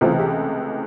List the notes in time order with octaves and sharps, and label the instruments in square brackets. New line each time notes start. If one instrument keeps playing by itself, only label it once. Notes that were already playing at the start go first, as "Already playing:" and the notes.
[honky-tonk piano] C#2 C3 E3 A3 C4 F4
G4